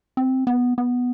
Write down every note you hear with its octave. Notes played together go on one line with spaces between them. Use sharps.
C4
B3
B3